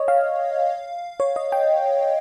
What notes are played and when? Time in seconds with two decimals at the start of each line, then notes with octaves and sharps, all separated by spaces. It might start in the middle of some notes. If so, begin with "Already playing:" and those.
Already playing: C#5 D#5
0.08 F5
1.20 C#5
1.36 D#5
1.52 G5